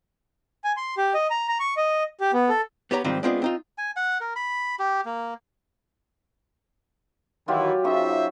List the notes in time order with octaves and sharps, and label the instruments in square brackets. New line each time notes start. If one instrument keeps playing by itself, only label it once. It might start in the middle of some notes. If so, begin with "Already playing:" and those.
[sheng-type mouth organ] G#5
C6
G4
D#5
A#5
A#5
C#6
D#5
G4
B3
A4
[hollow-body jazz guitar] B3 G4 C#5 A#5
G#2 D#3 F3 G3 C4 F4
G#3 B3 C4 D4 F4 G#4
C4 D#4 F4
[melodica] G#5
F#5
A#4
B5
G4
A#3
[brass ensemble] D#3 E3 E4 [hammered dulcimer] F#3 F4 G4
[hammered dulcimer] C#3 D#4 C#6 [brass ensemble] F4 C5 E5